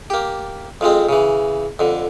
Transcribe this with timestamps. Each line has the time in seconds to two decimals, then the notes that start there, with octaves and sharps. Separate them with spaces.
0.10 A#3 G4
0.81 F2 F3 G#3 C4
1.09 C#3 E3
1.79 F2 D3